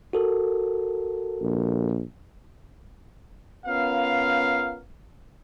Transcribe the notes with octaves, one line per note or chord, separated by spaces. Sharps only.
F#4 A4 A#4
A#1
B3 C#4 F4 A#4 F5